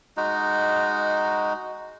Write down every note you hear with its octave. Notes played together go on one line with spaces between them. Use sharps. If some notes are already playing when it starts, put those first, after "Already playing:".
G#3 D#4 F#4